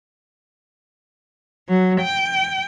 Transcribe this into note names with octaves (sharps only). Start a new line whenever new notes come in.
F#3
G5